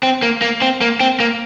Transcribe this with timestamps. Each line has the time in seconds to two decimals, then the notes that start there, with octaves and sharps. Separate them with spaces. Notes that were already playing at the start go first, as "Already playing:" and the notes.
0.03 C4
0.22 A#3
0.42 A#3
0.62 C4
0.81 A#3
1.00 C4
1.20 A#3